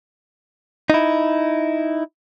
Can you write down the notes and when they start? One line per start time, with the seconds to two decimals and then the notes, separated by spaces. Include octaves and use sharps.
0.90 D#4 E4